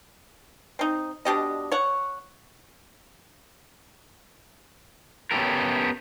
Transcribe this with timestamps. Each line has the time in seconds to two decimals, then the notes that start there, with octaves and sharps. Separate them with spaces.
0.79 C4 D#4
1.25 B2 D4 G4 D#5
1.72 C#5 F#5
5.31 B3 C#4 D#4 G4 A4 A#4